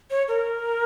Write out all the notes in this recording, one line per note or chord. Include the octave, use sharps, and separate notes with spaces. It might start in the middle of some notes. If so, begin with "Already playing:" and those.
C#5
A#4